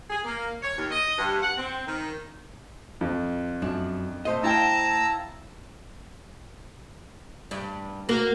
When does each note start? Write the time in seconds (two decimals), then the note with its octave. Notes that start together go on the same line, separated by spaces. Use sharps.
0.10 G#4
0.25 A#3
0.63 C#5
0.78 D#2
0.91 D#5
1.18 G2
1.42 F#5
1.58 C4
1.86 D#3
3.01 F2
3.62 F#2 D4
4.25 A3 C5 D#5
4.43 E4 F5 G5 A5 A#5 E6
7.51 G2
8.09 A#3 F#4 A#4